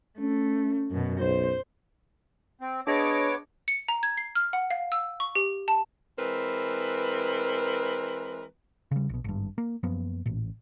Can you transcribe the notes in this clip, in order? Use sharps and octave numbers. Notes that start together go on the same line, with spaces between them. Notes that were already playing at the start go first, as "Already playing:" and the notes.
A3 C#4
F#2 B2
B1 C5
C4
B3 D4 G#4 C#5 D#5 D6
C#7
A#5
G#6
C7
F6
F#5
F5
E6
C#6
G4
A5
E3 G#3 C4 A#4 B4
C#3 G3
A#1 B2
G#1 G2
A#3
F#2 F3 A#3 B3
A1 A#2